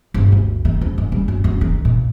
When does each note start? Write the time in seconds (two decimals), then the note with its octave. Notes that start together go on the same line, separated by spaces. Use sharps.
0.14 G1
0.32 D2
0.65 D#3
0.81 F2
0.98 G#2
1.12 G3
1.28 F#2
1.44 F#2
1.61 D#3
1.85 A#2